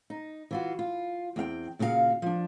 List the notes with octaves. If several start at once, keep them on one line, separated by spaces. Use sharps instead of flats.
D#4
E3 F4 F#4
F4
E2 C4 F5 G5
A#2 C#3 F#4 G4 F5
F3 D4